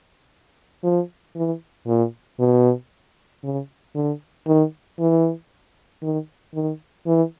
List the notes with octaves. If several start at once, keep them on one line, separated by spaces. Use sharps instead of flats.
F3
E3
A#2
B2
C#3
D3
D#3
E3
D#3
D#3
E3